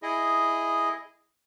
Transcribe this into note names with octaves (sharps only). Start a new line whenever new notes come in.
E4 G#4 D#5